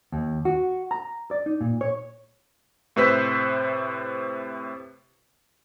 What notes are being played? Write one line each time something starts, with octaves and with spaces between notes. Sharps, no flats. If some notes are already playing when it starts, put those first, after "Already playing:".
D#2
F#4
A#5
D5
D#4
A#2
C#5
A2 C3 B4 C5 E6 B6